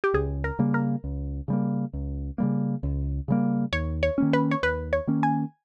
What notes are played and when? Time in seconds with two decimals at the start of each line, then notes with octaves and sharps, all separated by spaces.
0.04 G4
0.14 C#2 G#4
0.44 A#4
0.59 C#3 G3 A#3
0.74 A#4
1.04 C#2
1.48 C#3 G3 A#3
1.93 C#2
2.38 C#3 G3 A#3
2.83 C#2
3.28 C#3 G3 A#3
3.73 D#2 C#5
4.03 C#5
4.18 D#3 A#3 C#4
4.33 B4
4.51 C#5
4.63 D#2 B4
4.93 C#5
5.07 D#3 A#3 C#4
5.23 G#5